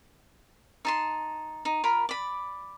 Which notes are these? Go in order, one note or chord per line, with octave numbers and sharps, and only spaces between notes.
D#4 A5 C6
D#4
F4 A#4 B5
D5 B5